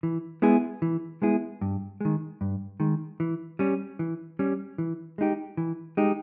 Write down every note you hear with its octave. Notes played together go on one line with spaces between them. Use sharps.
E3
G#3 B3 E4 G#4
E3
G#3 B3 E4 G#4
G2
D#3 G#3
G2
D#3 G#3
E3
G3 C#4
E3
G3 C#4
E3
G#3 D#4 G4
E3
G#3 D#4 G4